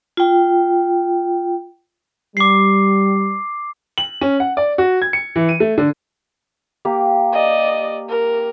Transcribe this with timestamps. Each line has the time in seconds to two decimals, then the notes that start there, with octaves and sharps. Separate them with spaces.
0.17 F4 G5
2.37 G3 D6 C7
3.98 F#7
4.21 C#4
4.40 F#5
4.57 D5
4.78 F#4
5.02 G#6
5.13 C#7
5.36 E3
5.49 D#7
5.60 A3
5.78 D3
6.85 A#3 G4
7.33 D5 D#5
8.10 A#4